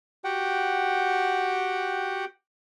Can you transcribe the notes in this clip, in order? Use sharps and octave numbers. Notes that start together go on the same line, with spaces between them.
F#4 G4 F#5 G5